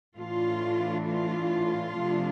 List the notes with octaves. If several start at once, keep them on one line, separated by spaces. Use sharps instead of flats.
A2 E3 A3 D4 F4
F4
C3 F3 A3 D4